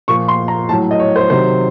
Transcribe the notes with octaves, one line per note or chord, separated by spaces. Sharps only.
A#2 F3 C#6
C6
A#5
A2 F#3 A5
D#5
C#5
C5
C3 D#3 F#3 C5